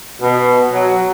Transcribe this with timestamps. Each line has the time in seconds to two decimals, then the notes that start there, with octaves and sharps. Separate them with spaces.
0.21 B2
0.72 F#3